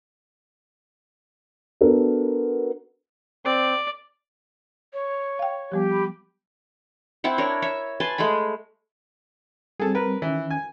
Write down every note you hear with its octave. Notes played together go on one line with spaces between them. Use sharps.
B3 D4 F#4 A4 A#4
C4 D5
C#5
F5 G5
F3 G3 B3 G4
B5
C4 E4 E5 F#5
D4 A#4 C#5
C#5 E5
B4 G#5 A5 C6
G#3 A3 G#4 B5
G3 C4 G#4 A4
A#4 B4
D#3 E3 C#4
G#5